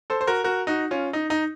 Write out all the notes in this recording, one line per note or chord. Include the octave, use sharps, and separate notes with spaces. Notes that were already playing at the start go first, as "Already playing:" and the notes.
A4 C5
C5
F#4 A#4
F#4 A#4
D#4 F#4
C#4 F4
D#4
D#4